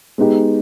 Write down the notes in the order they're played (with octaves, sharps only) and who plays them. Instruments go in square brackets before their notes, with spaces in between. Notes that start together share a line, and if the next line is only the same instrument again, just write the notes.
[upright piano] G#3 B3 D#4 G4